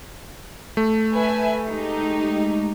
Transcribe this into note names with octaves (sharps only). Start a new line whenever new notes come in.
A3
B4 E5 G#5
G#3 D#4 G4